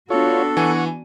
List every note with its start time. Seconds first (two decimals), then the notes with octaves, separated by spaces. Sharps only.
0.10 B3 D4 F4 F#4 A4 C#5
0.57 E3 F#5 G#5 C#6 D#7